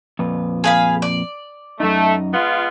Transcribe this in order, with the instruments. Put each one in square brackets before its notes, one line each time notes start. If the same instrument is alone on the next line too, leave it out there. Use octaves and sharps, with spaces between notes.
[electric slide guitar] F2 A#2 B4
[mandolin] G#4 F5 B5
D5
[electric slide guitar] F#2 D#4 [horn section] A3
[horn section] G#3 B3 F4